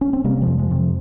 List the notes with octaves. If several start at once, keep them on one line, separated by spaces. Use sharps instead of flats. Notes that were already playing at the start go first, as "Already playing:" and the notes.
C#4
C4
C3 G3 A#3
F3 G#3
F2
F3 G#3
C3 F3